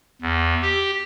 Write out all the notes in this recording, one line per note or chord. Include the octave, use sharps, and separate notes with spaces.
E2
G4